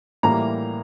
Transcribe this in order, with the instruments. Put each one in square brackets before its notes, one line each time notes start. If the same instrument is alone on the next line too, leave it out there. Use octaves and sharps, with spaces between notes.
[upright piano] A2 E3 G3 A#3 A#5